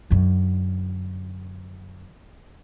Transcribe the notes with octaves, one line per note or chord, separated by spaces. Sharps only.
F#2 D3